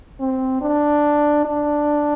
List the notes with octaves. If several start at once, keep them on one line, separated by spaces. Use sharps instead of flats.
C4
D4
D4